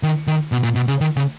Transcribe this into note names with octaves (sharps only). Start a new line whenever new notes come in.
D#3
D#3
B2
A#2
B2
C#3
D#3
C#3